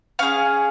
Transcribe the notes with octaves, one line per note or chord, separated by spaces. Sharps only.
C#4 G#4 F5